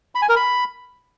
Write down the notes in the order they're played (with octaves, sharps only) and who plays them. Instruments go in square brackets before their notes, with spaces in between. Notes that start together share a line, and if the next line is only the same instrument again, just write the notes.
[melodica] B5
G#5
A#4
B5